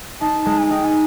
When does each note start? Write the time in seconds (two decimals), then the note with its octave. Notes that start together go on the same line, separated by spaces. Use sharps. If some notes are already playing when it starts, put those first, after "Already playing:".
0.21 D#4 A5
0.46 G#3
0.58 G#5
0.71 D#4 G5
0.85 G#5